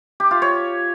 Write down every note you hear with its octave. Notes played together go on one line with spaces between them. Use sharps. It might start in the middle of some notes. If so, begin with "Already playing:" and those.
G4
F4
C#5